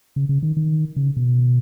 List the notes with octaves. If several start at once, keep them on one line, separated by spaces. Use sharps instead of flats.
C#3
C#3
D#3
D#3
C#3
B2